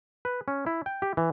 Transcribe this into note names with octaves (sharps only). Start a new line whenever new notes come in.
B4
C#4
E4
G5
G4
E3